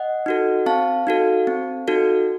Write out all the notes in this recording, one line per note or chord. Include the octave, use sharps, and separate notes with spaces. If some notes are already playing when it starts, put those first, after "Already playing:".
Already playing: D#5 F#5
D#4 F#4 A4
C4 F5 A5
D#4 F#4 A4
C4
D#4 F#4 A4